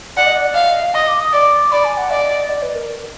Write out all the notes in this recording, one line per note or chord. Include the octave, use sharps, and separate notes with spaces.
D5 F#5
D#5
D5
F5
D#5
F5
D#5 D#6
D6
D#6
D5 D6
D5 B5
G#5
F#5
D5 D#5
D5
B4
A#4